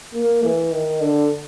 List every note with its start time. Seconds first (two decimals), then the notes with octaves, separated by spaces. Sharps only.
0.15 A#3
0.43 E3
0.72 D#3
1.00 D3